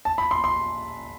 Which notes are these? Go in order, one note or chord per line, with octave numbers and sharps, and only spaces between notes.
A5
B5
C6
C6